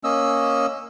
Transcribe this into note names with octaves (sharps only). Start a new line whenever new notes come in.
A#3 C#4 D#5 E6